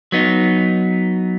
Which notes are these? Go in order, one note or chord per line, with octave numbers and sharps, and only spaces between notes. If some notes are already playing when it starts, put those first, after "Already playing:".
F#3 B3 D#4